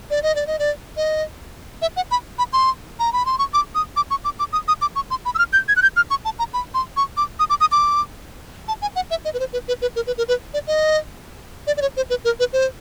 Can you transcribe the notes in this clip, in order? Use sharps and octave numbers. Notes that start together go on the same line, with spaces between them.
D5
D#5
D5
D#5
D5
D#5
E5
F#5
B5
B5
C6
A#5
B5
C6
C#6
D6
D#6
D6
C#6
D6
D6
D#6
D#6
D6
C#6
C6
B5
E6
F6
G6
G#6
F#6
G6
F6
C#6
A5
A#5
B5
C6
C#6
D6
D#6
D6
D#6
D6
A5
G#5
F#5
E5
D#5
B4
C5
B4
B4
B4
A#4
B4
A#4
B4
D5
D#5
D5
D5
C#5
C5
B4
A#4
B4
C5